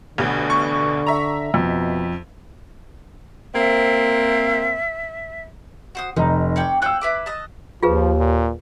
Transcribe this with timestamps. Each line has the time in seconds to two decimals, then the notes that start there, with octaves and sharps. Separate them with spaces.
0.18 A1 D2 B2 D3
0.50 C#6
1.06 E5 A#5
1.54 F2 B2
3.54 A#3 C4 E5
5.95 F#4 C5 D#6
6.16 F1 D#4 A#5
6.56 C#5 D5 G5
6.82 F4 C#5 G5 E6 F#6
7.01 E4 B4 D6
7.26 D#5 A5
7.83 D#2 F3 F4 G#4 B4
8.19 A#2